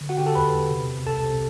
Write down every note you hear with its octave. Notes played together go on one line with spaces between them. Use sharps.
D3
F#4 F#5
D3 G4 G5
A4 A5
E2 B4 B5
E2
C3
C3
C2 A4 A5
C3